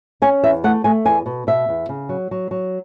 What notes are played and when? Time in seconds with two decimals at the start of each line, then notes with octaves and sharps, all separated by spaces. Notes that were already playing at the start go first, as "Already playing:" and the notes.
0.22 C#4 G#5
0.43 E2 E5
0.64 A3 F#5
0.84 A3 G#5
1.05 E2 G#5
1.26 B2
1.47 B2 E5
1.69 E2
1.89 C#3
2.09 F#3
2.31 F#3
2.51 F#3